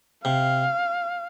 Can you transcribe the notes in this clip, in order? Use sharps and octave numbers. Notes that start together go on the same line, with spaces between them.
C3 F5